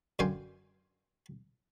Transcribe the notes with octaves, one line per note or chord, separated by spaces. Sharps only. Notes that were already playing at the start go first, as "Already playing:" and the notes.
F#2 D3 F5 G5 G#5 C6